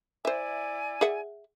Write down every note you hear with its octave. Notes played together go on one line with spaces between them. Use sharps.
E4 C5 D5 E5 G#5
G#4 E5 F#5